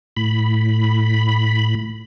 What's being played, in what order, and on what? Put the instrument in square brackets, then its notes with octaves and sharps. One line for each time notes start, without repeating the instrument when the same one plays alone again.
[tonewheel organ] A2 B5